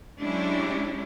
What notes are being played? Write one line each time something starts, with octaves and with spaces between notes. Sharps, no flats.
F#3 G#3 C#4 D4 E4 G4